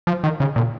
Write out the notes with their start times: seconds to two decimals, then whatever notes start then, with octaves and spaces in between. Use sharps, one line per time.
0.07 F3
0.24 D#3
0.40 C#3
0.56 A#2